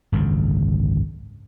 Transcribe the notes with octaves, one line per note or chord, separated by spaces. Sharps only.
G#1 C#2 F#2 D3